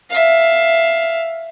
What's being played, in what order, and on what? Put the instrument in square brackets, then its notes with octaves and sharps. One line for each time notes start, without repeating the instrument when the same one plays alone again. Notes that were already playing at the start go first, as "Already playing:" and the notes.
[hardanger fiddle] E5 F5